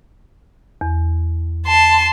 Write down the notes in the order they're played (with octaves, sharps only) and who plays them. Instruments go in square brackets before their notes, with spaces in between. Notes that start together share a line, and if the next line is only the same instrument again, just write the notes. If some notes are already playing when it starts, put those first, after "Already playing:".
[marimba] E2
[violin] A5 C6